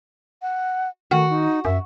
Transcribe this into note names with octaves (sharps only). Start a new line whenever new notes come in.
F#5
D#3 A3 F#4
D#4
F#2 E5